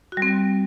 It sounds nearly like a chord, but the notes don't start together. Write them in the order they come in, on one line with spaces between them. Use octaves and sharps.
F#4 G3 C4